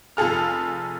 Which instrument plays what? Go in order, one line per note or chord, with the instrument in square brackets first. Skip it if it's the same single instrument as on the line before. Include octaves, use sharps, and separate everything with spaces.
[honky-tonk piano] F1 F4 G#4 A4 F6